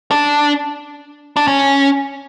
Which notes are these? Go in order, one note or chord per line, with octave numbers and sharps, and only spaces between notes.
D4
D4
C#4